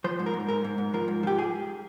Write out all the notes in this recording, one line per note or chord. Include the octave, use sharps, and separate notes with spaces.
F3 C5
G#2
A#4
G#2
G#2 A#4
G#2
G#2
F3 A#4
G#2
F3 G4
G#4